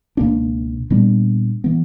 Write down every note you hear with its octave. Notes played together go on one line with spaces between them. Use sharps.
C#2 B2 A#3 D4
A#2 G3 B3 D4
E3 B3